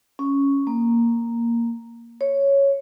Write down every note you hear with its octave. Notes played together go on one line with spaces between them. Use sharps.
C#4
A#3
C#5